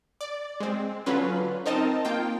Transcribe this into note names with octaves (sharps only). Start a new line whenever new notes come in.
D5
G#3 C4
D3 F#3 C#4 F4 B4
C4 D#4 A#4 D#5 A5
A#3 F4 G5